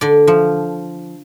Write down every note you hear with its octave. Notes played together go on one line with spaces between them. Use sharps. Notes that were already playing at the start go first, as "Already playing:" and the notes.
D3 D5
F3